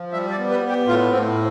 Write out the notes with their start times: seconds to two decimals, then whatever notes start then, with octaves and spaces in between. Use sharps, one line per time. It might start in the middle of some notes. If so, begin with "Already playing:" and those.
Already playing: F3
0.13 G3 E5
0.31 D5
0.38 B3
0.50 B4
0.63 B3
0.69 G4
0.87 A2 F4
1.11 A2 C4